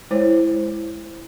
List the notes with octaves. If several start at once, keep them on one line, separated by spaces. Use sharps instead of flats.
G#3 E4 C5 C#5